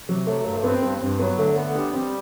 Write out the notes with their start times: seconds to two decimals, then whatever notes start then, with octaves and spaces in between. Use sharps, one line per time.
0.08 C3 F#3
0.26 F#3 A3
0.45 G2 A3
0.55 A3
0.64 B3 C4
0.82 G2 B3
1.01 G2 C4
1.19 F#3 B3
1.38 D3 A3
1.56 A3 B3
1.75 G3 D4
1.94 G3 C4